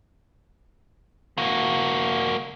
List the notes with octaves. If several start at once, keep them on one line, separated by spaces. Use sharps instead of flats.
A#3 F#4